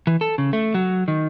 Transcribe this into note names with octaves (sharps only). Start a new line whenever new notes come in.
E3
A4
C#3
A3
F#3
D#3